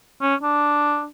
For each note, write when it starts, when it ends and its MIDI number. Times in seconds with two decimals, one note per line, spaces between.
0.22 0.35 61
0.43 1.07 62